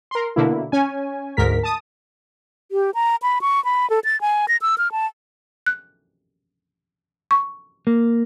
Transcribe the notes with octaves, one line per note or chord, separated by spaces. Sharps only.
A#4 C6
B2 D3 A#3 E4
C#4 G#5
D2 G#2 A#4 B6
A5 D#6
G4
A#5
B5
C#6
B5
A4
A6
G#5
A#6
E6
F6
A5
F#6
C#6
A#3